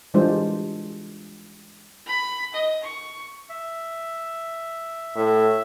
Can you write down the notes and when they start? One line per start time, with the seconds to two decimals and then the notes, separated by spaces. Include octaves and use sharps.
0.14 E3 G3 G#3 D4 F4 C5
2.06 B5
2.54 D#5
2.83 C#6
3.49 E5
5.16 A2 E5